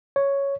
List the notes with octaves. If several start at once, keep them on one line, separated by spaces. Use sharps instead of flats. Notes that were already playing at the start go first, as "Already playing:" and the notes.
C#5